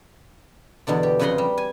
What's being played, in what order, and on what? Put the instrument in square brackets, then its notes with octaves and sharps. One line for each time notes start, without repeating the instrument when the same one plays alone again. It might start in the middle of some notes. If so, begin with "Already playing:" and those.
[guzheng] E2 B2 D3 D5
G4
F2 C#3 B4 F#5 A#5 C6
G3
G#5